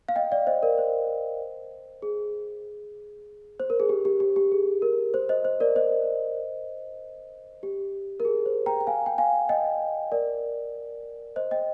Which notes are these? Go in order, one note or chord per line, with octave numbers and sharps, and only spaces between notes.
F5
D#5 G5
D5 F5
C5 D#5
A#4 D5
C5
G#4
C5
A#4
G#4
G4
G4
G4
G4
G#4
A#4
C5
C5 D#5
C5
A#4 D5
C5 D#5
G4
A#4
G#4
C5
G5 A#5
G5
F5 G#5
G5
F5 G#5
D#5 G5
A#4 D5
C5 D#5
D#5 G5